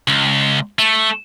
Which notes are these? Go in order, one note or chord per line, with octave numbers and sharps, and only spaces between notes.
C#2
A3